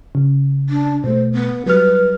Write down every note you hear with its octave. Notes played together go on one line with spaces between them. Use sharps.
C#3
D4
B2 A3 C5
B3
F#3 G3 B4 F6